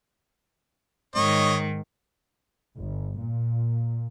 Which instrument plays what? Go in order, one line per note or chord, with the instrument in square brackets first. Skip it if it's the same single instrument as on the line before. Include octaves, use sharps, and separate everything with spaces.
[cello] G#2 D#3 [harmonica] C#5 D#5
[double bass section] G1
A#2